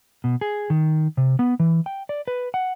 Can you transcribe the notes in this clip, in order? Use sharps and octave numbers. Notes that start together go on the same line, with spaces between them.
B2
G#4
D#3
C3
B3
E3
G5
D5
B4
F#5